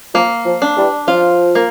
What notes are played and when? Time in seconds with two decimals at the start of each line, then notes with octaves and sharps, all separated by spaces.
0.14 F3 A#3
0.46 F3
0.62 D4
0.77 E3 G3
1.08 F3 F4
1.55 A#3